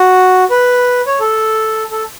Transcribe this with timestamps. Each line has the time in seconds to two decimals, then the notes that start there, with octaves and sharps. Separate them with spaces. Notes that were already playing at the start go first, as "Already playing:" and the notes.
Already playing: F#4
0.50 B4
1.07 C#5
1.20 A4
1.91 A4